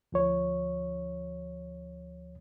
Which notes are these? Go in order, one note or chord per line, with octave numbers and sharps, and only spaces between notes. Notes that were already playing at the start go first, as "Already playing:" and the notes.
D2 F3 C#5